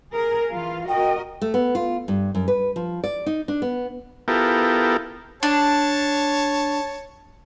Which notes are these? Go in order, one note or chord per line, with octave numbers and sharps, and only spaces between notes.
G#4 A#4
E3 F4 F5
F#4 A#4 D#5 G5
A3
B3
F4
G2
F#2
B4
F3
D5
D#4
D4
B3
B3 E4 F4 G4 A4 A#4
D4 C#5 A5